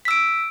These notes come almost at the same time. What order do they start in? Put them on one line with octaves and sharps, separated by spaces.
B6 E6 D7